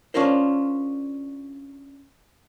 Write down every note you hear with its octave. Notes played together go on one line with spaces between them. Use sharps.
C#4 D4 F4 A#4 C5